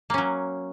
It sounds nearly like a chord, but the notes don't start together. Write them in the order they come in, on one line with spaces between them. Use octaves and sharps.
A#3 C#4 F#3